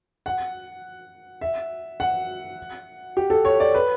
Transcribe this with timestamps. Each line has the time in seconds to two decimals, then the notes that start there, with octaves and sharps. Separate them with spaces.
0.26 F#5
1.41 E5
2.00 F#5
3.17 G4
3.30 A4
3.45 C#5
3.60 D5
3.74 B4